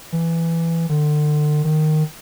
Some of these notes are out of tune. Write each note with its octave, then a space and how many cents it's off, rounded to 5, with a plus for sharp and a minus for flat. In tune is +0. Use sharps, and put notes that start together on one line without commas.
E3 +10
D3 +35
D#3 -10